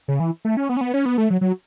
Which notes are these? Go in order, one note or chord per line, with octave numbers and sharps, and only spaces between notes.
C#3
E3
A3
C#4
B3
C#4
B3
C#4
B3
A3
F#3
F#3